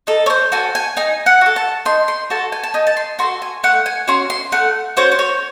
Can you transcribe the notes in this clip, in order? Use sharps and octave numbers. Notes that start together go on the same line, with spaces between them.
D#4 A4
C#5
C5
F#4 A4 G#5
G#5
D#4 G#5
F#5
F#4 A4
A5
D#4 C6
C6
F#4 A4 A5
G#5
A5
D#4 G#5
A5
C6
F#4 A4 C6
G#5
A3 F#5
G#5
C#4 F#4 C6
C6
A3 F#5
C#4 F#4 C5
C5
C#5